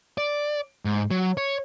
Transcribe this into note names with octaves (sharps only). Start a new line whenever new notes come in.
D5
G#2
F#3
C#5